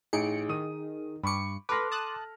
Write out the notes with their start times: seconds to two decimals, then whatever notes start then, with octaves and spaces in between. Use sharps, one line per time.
0.13 A1 D#4 G#4 C#7 D7
0.49 D#3 D#6 D#7
1.23 G2 B5 C#6 D6 C#7
1.69 A4 B4 C6 D6 F6 A#6
1.91 A5 D#6 F#6